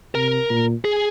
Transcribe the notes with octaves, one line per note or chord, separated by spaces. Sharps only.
C3 A#4
A#2
G#4